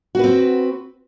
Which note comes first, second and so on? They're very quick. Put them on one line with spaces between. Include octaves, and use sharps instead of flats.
F#4 B4 C4